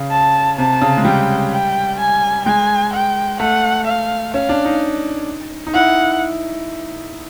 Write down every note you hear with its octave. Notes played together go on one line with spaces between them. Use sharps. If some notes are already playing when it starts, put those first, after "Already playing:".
Already playing: C#3
A5
C3 A5
C#3
G#3
G3 G5
G5
G#5
G#3 G#5
G5
A3 F#5
F5
C#4 F5
D4
D#4
D#4
E4 F#5